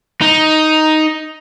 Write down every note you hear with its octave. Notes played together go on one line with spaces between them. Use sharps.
D#4